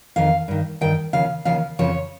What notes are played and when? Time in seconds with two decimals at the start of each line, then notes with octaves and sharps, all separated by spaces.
0.16 F2 D#3 F5
0.48 G2 D#3
0.81 G2 D#3 G5
1.13 D#2 C#3 F3 F5
1.45 D#2 C#3 F3 F5
1.79 F2 C#3 F3 C#5